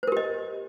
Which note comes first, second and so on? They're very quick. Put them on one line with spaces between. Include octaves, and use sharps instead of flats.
C5 A#4 G4 D#5